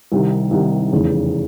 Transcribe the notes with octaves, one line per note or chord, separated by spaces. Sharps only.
C2 C3 D#3
C2 C3 D#3
F1 E2 C#3